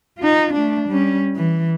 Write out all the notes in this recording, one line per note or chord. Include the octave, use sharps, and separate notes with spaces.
D#4 F4
A3 D4
G3 C#4
E3